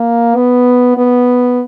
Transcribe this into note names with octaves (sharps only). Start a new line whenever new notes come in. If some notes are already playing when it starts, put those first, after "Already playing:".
Already playing: A#3
B3
B3